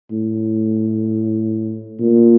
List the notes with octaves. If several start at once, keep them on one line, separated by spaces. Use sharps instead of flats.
A2
A#2